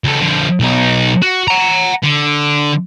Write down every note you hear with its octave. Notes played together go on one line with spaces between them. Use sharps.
C#2 A4
D3 F3
B1 D#4
F#4
F#5 A#5
D3